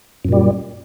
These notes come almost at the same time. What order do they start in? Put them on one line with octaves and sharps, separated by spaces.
F#2 A#2 G3